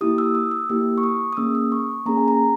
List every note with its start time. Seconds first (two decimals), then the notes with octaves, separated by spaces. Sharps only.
0.01 A#3 E4 G4 D#6
0.18 E6
0.35 D#6
0.51 E6
0.70 A#3 E4 G4 E6
0.98 C#6
1.03 D#6
1.33 D#6
1.37 A#3 C#4 G#4 E6
1.55 D#6
1.72 C#6
2.06 A#3 C#4 G#4 A#5
2.17 G#5
2.28 A#5